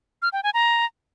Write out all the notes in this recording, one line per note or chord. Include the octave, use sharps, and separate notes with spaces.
F6
G5
G#5
A#5